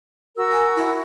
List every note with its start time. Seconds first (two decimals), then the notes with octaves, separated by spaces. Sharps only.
0.36 F#4 A#4 E6
0.52 G#5
0.76 E4